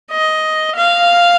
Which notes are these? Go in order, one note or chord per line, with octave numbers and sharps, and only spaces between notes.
D#5
F5